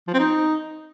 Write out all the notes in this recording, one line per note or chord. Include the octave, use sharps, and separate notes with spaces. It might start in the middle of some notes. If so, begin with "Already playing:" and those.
F3
C4
D#4